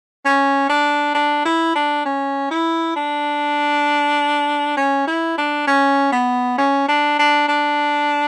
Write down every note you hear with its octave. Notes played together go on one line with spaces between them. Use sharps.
C#4
D4
D4
E4
D4
C#4
E4
D4
C#4
E4
D4
C#4
B3
C#4
D4
D4
D4